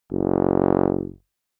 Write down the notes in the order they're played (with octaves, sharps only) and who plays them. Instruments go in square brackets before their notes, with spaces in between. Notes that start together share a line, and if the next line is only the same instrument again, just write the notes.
[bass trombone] F#1